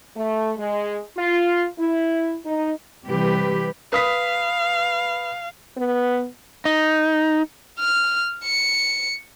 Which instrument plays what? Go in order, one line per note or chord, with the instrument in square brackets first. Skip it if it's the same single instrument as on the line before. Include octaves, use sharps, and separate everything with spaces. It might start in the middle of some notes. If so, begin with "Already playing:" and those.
[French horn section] A3
G#3
F4
E4
D#4
[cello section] C3 E3 G3 G4 B4
[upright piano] B4 D#6 B6 [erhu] F5
[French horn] B3
[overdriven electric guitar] D#4
[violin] F6
C#7